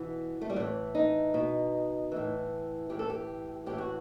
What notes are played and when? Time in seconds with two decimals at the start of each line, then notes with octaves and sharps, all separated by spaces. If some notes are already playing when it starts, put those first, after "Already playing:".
Already playing: B2 E3
0.41 A3
0.50 G3
0.56 A2 F#3
0.60 E3
0.95 D#4
1.34 B2
2.12 A2 E3
2.89 A2 E3 G4
2.99 A4
3.10 G4
3.66 A2 E3 G4
3.78 F#4